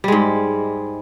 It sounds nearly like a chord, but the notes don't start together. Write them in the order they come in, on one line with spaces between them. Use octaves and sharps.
G3 G#3 G#2